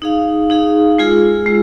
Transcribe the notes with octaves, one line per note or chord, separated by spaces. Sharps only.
D#4 G#4 F5
D#4 G#4 F5
G#3 F4 G#4
G#3